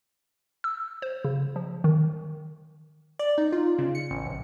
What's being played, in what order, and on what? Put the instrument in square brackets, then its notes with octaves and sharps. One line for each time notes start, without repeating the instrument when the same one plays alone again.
[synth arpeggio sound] E6
C5
C#3
F3
D#3
[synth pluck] D5
D#4
F4
C#3
C#7
A1
A#1